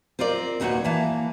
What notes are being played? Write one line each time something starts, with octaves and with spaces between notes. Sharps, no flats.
C4 F4 A#4 D5
D#2 A#2 D#4 F#4 B4 C#5
E3 A#3 A5